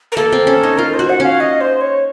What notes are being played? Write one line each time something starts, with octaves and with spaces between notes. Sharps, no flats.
A#4
A#3 A4
C4
C#4
D#4
F4 A#4
C5
F#4
F#5
C#4 F5
D#5
C5
C#5